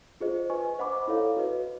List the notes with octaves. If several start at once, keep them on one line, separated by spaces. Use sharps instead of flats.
F4 G#4 C5 D#5
B4 D#5 G#5 C#6
C5 D#5 F#5 B5 D6
E4 A4 C#5 F5
F#4 B4 D#5